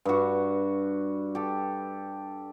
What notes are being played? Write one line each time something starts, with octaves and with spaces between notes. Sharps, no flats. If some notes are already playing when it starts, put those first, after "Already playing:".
G2 F#4
G4 A4